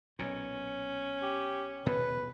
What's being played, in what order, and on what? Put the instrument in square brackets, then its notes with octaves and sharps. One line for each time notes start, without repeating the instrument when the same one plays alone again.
[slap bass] B1 A#2 [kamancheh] C#4
[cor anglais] G4
[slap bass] D#1 B2 B3 [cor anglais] B4